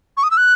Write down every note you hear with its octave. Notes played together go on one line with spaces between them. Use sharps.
C#6
D#6
E6
F#6